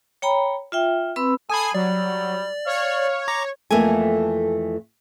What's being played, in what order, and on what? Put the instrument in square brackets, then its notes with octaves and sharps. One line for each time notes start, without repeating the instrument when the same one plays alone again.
[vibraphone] C#5 G5 A#5 B5
F4 E5 G5
C4 B4 B5 E6
[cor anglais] A4 [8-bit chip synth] G#5 B5 [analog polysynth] D#6 G#6 C7
[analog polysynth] F#3 [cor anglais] G3 [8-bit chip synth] D5
[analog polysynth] C#5 [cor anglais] F5
[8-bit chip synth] A#5 D6 A#6
[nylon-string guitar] F2 E3 A3 A#3 A4 G#5